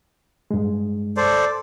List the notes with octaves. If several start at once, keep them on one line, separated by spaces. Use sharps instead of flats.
G2 G#3
A4 C5 D5